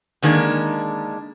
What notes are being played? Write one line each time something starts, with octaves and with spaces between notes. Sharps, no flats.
D3 D#3 G#3 A#3 D4